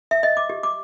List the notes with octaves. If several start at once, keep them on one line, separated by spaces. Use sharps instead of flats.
E5
D#5
D6
G4
D6